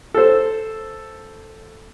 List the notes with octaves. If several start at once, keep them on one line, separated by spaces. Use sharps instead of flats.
A4 C5